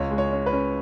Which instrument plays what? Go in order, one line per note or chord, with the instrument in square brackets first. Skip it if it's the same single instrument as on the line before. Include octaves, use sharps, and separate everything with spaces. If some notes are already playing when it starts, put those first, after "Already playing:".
Already playing: [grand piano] C#2 C#5
G#3
C#5
C#4
B4
C#4